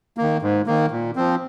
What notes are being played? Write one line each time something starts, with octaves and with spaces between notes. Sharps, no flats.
D#3 A#3
G#2
D#3 A#3
A#2
F3 C4